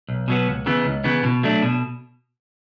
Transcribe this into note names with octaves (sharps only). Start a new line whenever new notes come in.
B1
B2 F#3 B3
C#2
C#3 E3 B3
C#2
C#3 E3 B3
B2
F#3 A3 D4
B2